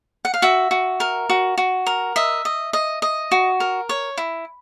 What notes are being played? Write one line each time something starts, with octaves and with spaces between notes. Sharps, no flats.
F#5
F5
F#4 E5
F#4
A#4
F#4
F#4
A#4
D#5 E5
D#5
D#5
D#5
F#4
A#4
C#5
E4